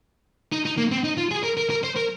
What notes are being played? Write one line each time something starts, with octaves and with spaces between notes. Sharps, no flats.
D#4
D#4
A#3
C4
D#4
F4
G#4
A#4
A#4
A#4
C5
A#4